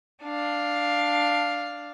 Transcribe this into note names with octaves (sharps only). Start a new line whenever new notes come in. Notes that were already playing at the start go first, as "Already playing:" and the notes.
D4 F5